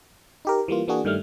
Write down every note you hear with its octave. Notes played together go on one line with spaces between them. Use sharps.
D#4 G4 A#4
E3 G3 A#3 F4
E3 A#3 D4 F#4 G#4
G2 D#3 G3 A3 F6